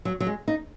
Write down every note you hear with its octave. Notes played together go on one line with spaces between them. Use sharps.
F#3
F#3
G#3
D#4